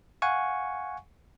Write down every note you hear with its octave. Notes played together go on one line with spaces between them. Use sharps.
F5 F#5 G#5 C#6